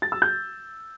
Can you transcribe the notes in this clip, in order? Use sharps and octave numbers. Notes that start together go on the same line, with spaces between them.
A6
E6
G6